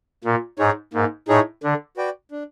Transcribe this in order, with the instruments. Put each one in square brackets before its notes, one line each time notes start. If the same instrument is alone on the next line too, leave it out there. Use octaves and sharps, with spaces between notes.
[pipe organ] A#2 [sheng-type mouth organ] A#3
[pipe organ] G#2 [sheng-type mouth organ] D#4 G#4 C#5
[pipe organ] G#2 [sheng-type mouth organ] A#3
[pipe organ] A2 [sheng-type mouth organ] D#4 G#4 C#5
[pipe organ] D3 [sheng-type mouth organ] D4
[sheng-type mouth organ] F#4 B4 D5 G5
D4